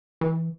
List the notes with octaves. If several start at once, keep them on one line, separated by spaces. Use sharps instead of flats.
E3